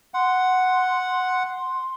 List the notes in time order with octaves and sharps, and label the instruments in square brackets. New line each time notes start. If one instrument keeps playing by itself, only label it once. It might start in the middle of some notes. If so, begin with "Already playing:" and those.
[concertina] F#5 [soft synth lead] C6